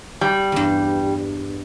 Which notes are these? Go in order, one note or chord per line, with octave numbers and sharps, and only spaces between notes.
G3
E2 G2